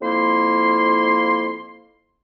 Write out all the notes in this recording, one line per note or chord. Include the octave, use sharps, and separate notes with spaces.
F2 A#3 E4 C6